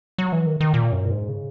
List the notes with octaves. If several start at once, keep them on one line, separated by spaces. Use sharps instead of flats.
F#3
E3
D#3
D#3
A#2
F#2
A#2
G#2
C#3